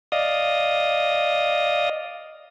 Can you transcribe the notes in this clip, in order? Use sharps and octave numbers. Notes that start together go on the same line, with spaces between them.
D5 D#5 F5 D#6